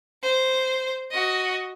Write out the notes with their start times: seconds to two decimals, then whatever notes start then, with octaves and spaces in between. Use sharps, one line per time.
0.23 C5
1.12 F#4 D#5